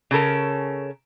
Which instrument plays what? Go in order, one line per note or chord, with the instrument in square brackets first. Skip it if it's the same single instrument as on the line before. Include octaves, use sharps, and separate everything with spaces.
[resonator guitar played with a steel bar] C#3 C#4 A4 A#4